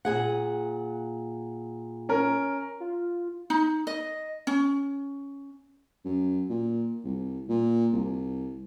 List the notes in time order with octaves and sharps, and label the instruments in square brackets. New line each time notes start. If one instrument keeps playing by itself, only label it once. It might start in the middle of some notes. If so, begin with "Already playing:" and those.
[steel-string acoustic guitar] A#2 G#4 F#5
[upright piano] C#4 A#4
[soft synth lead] F4
[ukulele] D#4
D#5
C#4
[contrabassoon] F#2
A#2
C2
A#2
C2